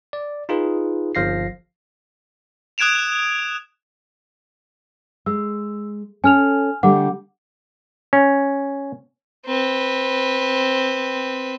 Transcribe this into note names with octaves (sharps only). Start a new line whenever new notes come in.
D5
D#4 F4 G#4 B4
G1 F3 F5 A#6 C7
D#6 F#6 G#6 D7 E7 F7
G#3 E6
C#4 A4 G#5 F6 F7
D3 G3 A3 F#5 D6
C#4
C4 B4